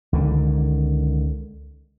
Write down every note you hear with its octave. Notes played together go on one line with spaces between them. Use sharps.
C#2 D3 D#3